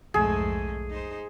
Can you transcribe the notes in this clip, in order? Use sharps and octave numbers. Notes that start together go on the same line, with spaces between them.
B1 F2 G#2 A3 G#4
D#4 C5